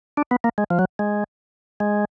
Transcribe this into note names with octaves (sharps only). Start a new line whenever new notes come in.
D4
B3
A#3
G#3
F3
F#3
G#3
G#3